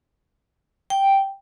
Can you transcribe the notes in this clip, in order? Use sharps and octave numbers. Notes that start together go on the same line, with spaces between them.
G5